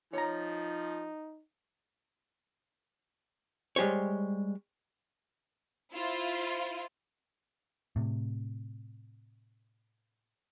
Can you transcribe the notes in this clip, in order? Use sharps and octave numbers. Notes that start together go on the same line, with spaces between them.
F3 D#4 C#5 A#5
G3 G#3 G4 C5 C#5
E4 F4 C5
A2 C3